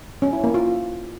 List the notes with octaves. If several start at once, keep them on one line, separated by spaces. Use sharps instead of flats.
C#4
E4
A#3
F4